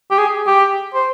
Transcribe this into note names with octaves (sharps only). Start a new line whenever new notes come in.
G4
G#4
G4
C5